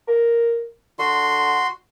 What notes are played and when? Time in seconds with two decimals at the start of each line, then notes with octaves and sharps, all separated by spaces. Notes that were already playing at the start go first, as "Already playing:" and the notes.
0.08 A#4
0.99 D3 F#4 C6